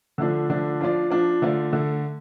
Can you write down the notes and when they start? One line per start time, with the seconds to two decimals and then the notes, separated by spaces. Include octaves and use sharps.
0.18 D3 F3 A3 D4
0.49 D3 F3 A3 D4
0.80 F3 D4 F4 D5
1.10 F3 D4 F4 D5
1.42 D3 A3 F4 D5
1.73 D3 A3